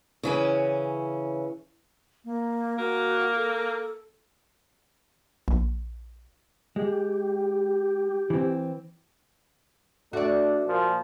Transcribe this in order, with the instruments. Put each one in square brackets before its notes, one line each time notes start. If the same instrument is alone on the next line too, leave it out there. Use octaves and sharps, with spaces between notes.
[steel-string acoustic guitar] C#3 E3 C#4
[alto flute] A#3
[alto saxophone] A#3 [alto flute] F#4
[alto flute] A4
[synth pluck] A#1
[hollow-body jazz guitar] G#3 [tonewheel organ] G4
[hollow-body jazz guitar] E3 C4
[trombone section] A3 D4 [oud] F#4 D5
[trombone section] A#2 F3